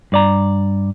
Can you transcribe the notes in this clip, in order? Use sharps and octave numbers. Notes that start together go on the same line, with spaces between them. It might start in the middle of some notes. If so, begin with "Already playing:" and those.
G2 D5 A#5